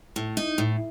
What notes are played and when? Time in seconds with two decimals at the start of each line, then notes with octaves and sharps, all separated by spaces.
0.16 A2
0.37 D#4
0.58 A2